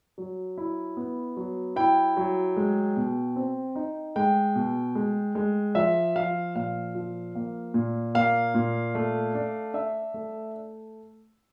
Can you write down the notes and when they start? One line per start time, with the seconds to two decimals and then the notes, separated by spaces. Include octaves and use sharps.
0.18 F#3
0.58 E4
0.97 B3
1.37 F#3
1.76 E4 G5
2.17 F#3
2.56 G#3
2.97 B2
3.36 C4
3.75 D#4
4.16 G#3 G5
4.55 B2
4.95 G#3
5.35 G#3
5.75 F3 E5
6.16 F3 F5
6.55 A#2 F5
6.95 F3
7.35 A#3
7.74 A#2
8.15 A#3 F5
8.54 A#2
8.95 A3
9.35 D4
9.74 D4 E5
10.14 A3